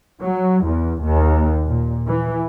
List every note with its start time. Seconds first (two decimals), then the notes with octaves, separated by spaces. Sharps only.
0.22 F#3
0.64 E2
1.03 D#2
1.67 A#2
2.07 E3